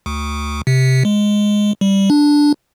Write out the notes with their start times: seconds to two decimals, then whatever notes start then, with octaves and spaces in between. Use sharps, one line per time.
0.06 D2
0.67 C3
1.05 G#3
1.81 G3
2.10 D4